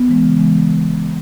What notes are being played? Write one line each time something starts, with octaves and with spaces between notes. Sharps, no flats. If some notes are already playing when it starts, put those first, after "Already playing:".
Already playing: B3
E3 G#3
C#3
E3 G#3